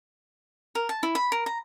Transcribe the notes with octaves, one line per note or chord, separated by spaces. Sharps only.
A#4
A5
E4
B5
A#4
A#5